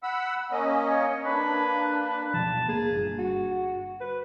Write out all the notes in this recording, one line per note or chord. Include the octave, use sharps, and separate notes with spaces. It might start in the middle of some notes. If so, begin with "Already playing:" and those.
F#5 B5 E6
A#3 C#4 D#5
C#5
A#3 D4 B4
B4
D1 B2 F3 A5
A#3 G#4
G1 G2
F#4
B4